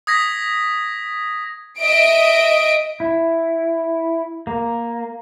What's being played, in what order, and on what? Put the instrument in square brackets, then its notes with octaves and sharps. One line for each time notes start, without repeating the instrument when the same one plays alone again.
[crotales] D#6 G#6 A#6 B6
[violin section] D#5 E5 D7
[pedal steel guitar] E4
A#3